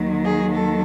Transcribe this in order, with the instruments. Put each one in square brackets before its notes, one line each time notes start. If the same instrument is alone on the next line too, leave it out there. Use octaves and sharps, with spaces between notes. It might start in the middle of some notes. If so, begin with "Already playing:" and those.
Already playing: [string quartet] D#2 D#3 F#3
G#4
A4